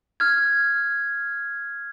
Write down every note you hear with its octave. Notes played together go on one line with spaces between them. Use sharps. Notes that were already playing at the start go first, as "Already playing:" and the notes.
F6 G#6